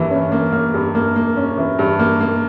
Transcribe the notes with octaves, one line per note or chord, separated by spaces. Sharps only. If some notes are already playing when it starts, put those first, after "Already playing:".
Already playing: G2 E3 A#3
C#4
A#3
A#3
G2
A#3
A#3
C#4
E3
G2
A#3
A#3